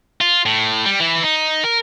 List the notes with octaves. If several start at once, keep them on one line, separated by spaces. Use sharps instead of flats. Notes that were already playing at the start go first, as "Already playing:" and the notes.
F4
A2
G3
E3 E4
D#4
A#4